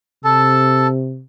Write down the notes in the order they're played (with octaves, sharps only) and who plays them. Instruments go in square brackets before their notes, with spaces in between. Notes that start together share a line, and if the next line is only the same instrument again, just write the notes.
[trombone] C3 [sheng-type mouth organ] A4 A5